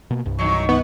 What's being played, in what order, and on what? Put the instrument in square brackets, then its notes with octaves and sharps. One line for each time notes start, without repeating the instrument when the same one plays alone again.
[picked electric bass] B2 A#3
C2 G2
[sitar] D#3 E3 F#3 [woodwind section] C#6
[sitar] D#3 [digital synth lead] B3